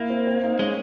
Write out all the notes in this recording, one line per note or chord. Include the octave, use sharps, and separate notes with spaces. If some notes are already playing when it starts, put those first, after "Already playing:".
Already playing: A#3 E4
C4
C4
D#4
G#3 C#4